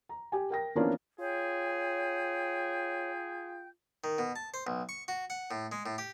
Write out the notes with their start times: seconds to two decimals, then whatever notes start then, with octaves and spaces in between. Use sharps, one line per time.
0.09 A#5
0.32 G4 G#5
0.50 A#4 G5 A#6
0.75 E3 F3 A#3 B3 C#4 D4
1.20 F4 G#4 C#5 G5 G6
4.04 D#3
4.18 B2
4.36 A5
4.54 C5
4.67 B1
4.89 C#6
5.08 F#4
5.30 F#5
5.51 A2
5.72 G#3
5.86 A2
5.98 G4